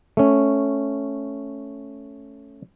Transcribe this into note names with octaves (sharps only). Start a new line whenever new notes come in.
A3 C#4